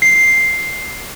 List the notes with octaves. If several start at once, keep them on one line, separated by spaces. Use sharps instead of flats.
C7